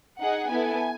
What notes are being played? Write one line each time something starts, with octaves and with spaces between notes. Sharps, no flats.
D#4 G#4 F#5
B3 E4 A4 G#5